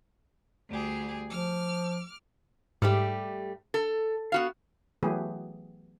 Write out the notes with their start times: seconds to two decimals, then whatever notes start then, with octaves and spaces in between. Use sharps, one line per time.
0.68 D2 G3 G#4
1.29 F3 D6 F6
2.82 G#2 G3 A3 G4
3.74 A4
4.32 B3 F#4 F5
5.03 E3 F#3 A3 B3 G4 G#4